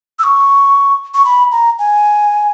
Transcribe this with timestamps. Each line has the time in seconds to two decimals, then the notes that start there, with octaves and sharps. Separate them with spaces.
0.19 E6
0.24 C#6
1.14 C#6
1.25 B5
1.52 A#5
1.79 G#5